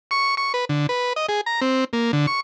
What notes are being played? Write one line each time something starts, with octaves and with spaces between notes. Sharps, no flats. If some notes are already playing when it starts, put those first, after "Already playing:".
C#6
C#6
B4
D3
B4
D#5
G#4
A#5
C4
A#3
D3
C#6